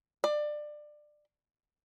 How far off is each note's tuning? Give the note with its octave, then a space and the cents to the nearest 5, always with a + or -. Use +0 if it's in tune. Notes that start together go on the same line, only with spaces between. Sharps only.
D5 +20